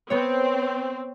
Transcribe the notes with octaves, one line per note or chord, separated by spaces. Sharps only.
B3 C4 C#5